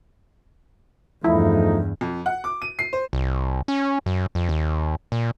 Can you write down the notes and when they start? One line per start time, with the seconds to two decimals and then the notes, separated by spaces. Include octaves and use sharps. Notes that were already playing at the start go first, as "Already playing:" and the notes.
1.24 E2 G2 F3 A3 D#4 E4
2.01 F2
2.26 F#5
2.44 D6
2.62 D#7
2.79 C7
2.93 C5
3.13 C2
3.68 C#4
4.06 F#2
4.35 F2
4.49 D#2
5.12 A#2